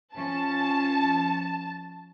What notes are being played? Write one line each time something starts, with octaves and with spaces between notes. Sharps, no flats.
F3 C#4 A5